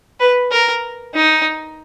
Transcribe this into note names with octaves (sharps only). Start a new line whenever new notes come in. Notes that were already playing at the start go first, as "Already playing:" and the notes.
B4
A#4
D#4